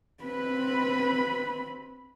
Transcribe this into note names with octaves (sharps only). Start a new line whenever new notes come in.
C4 B4 B5